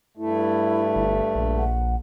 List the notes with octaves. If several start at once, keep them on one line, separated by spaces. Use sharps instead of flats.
G2 A3 E4
G1
A#1
F#5